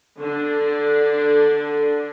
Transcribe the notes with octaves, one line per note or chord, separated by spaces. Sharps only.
D3 D4